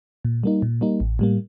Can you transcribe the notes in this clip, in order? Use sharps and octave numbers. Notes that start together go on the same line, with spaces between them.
A#2
G3 A#3 D#4
A#2
G3 A#3 D#4
A1
A2 G3 A#3